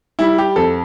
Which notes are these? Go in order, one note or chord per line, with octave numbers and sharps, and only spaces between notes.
G3 E4
G4
F2 A4